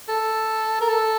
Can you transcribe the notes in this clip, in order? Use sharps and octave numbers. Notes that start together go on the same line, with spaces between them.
A4
A#4
A4